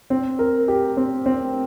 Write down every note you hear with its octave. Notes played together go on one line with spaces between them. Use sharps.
C4
A#4
G4
C4
C4